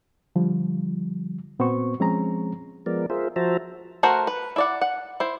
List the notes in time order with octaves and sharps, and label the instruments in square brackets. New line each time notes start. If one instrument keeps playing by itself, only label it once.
[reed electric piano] D3 F3 G3
A#2 B3 C4 F#4 C5 C#6
F3 G#3 C4 C#4 G#4 A#5
[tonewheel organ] F3 G#3 B3 A#4 D5
F4 G#4 A#4 C5 E5
F3 F#4 C5 E5 A5 A#5
[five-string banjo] A3 F#4 A#4 C5 F#5
B4
E4 D5 F#5
F#5
E4 C5